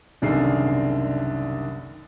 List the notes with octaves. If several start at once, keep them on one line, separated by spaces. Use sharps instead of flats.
F#1 C2 D3 D#3 G#4 C7